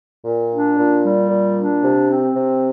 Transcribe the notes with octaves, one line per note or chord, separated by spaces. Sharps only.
A#2
D4
A#2
G3
A#2
D4
C3
C4
C3